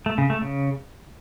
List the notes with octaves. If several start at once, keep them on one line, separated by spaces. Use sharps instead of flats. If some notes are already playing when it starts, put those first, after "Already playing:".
A3
C#3
A3
C#3